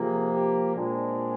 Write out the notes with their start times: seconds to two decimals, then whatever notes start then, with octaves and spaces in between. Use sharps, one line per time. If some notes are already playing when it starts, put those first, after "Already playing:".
Already playing: C3 F3 A#3 G#4
0.33 G4
0.74 A#2 G#3 C4 D4